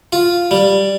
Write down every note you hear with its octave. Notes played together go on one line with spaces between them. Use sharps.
F4
G3